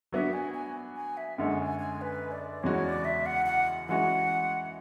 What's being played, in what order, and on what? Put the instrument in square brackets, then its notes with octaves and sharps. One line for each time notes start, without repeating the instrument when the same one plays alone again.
[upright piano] F#3 B3 D4 F#4 [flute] E5
[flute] G#5
G#5
G#5
E5
[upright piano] F#2 D3 G#3 C#4 [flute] F#5
[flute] G#5
G#5
B4
D5
[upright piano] E2 C#3 G#3 C#4 F#4 [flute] C#5
[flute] D5
E5
F#5
F#5
[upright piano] E3 G#3 C#4 F#4 [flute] F#5